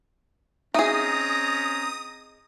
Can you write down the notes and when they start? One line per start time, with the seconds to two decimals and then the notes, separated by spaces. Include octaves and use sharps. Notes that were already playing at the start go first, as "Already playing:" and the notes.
0.74 C4 C#4 D#4 G#4 E5 A#5 D#6